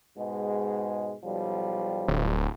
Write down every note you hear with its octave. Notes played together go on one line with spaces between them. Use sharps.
G#2 B2 G#3
B1 F3 G3
D1